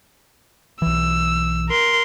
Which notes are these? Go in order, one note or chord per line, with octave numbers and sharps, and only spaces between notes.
B1 E3 E6
A#4 C6